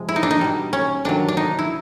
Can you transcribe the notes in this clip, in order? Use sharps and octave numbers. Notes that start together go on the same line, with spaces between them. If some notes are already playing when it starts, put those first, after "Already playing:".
Already playing: C3 F3 G#3
E4
D#4
D4
D#4
B2 G3
C#4
C3 D#3 F#3 D4
D4
D#4
E4